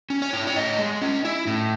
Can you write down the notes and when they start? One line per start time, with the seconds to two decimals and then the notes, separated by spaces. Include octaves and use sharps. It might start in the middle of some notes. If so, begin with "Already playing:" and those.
0.10 C#4
0.22 C#5
0.33 E4
0.47 C#5
0.56 A2 D#5
0.79 G#3
1.02 C#4
1.25 E4
1.47 A2